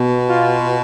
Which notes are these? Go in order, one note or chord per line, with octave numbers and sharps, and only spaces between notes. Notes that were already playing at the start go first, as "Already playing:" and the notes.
Already playing: B2
F4